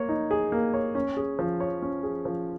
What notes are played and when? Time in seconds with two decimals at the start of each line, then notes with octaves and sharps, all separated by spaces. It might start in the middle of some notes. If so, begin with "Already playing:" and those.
Already playing: A#3 C#5
0.09 D#4
0.31 G#4
0.52 A#3
0.74 C#5
0.95 C#4
1.17 G#4
1.39 F3
1.60 C#5
1.82 C#4
2.03 G#4
2.25 F3